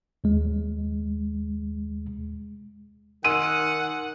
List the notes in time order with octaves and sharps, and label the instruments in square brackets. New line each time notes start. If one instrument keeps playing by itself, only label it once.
[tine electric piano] D#2 G#3
[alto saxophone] D#3 [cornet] F#5 [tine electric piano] G#5 C6 E6 [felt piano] D#7